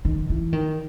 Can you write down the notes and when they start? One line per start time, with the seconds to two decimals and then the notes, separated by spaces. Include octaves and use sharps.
0.05 D#3
0.30 E3
0.53 D#3